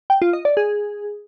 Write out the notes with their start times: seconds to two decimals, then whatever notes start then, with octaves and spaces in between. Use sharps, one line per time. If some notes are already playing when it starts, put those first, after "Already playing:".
0.10 G5
0.22 F4
0.33 D#5
0.45 D5
0.57 G#4